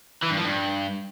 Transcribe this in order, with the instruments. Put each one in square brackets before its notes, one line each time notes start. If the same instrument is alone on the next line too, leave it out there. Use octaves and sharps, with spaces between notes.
[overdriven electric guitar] E3
G2
F3
G2